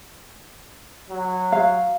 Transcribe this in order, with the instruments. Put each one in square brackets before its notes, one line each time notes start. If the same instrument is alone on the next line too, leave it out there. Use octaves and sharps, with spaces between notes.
[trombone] F#3
[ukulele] F5